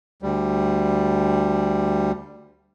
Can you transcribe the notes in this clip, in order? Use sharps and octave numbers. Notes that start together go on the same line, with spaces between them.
D2 G3